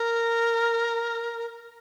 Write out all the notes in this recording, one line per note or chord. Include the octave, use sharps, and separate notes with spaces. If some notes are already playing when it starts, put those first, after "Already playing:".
Already playing: A#4